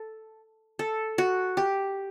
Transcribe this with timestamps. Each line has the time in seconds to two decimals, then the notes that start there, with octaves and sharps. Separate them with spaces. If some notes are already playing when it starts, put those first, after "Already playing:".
Already playing: A4
0.79 A4
1.18 F#4
1.57 G4